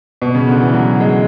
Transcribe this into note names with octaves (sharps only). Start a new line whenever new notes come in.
B2
C#3
D3
E3
F#3
G#3